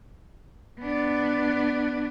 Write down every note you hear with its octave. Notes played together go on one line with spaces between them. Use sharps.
B3 D4